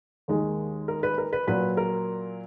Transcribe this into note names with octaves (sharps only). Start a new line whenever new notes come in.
D#2 D#3 G#3
A#4
B4
A#4
B4
A#2 F#3 B4
A#4